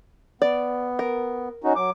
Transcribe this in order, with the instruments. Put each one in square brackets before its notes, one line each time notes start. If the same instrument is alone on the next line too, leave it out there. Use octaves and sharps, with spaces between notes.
[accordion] B3 [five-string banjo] D5
[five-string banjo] A#4
[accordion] C#4 D#4 F#4
F#3 D6